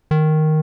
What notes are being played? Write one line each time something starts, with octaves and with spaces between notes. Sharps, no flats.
D#3